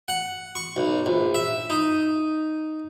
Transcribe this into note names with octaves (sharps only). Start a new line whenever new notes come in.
F#5
C#6
B1
A#1
E5
D#4